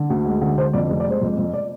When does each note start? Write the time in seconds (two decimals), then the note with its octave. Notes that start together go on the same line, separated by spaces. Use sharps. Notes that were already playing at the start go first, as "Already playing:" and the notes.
Already playing: D3
0.10 D2
0.25 G#3
0.41 D3
0.58 D3 C5
0.73 F2 D5
0.89 F1
1.00 D5
1.06 G#3 C5
1.21 F2
1.38 F2
1.53 D5